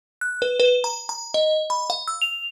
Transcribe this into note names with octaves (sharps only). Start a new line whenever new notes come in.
F#6
B4
B4
A#5
A#5
D#5
B5
F5
E6
F7